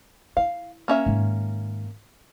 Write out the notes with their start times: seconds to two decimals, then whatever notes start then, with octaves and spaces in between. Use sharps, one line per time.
0.37 E4 F5
0.88 A#3 C#4 E5
1.06 G#2 D#3